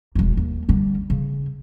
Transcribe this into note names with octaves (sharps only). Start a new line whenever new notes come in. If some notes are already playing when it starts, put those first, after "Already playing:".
E1 G#3
D#2
D3 G3
C#3